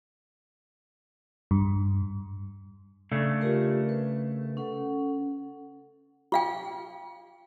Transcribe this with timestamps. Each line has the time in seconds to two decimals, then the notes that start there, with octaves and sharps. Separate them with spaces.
1.51 G2
3.12 C#3 A3 D4
3.41 F4 G4 A#4
3.89 B4
4.57 C#4 A4 F#5
6.32 F4 F5 G5